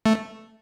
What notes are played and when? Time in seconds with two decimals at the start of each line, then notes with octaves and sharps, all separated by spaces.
0.06 A3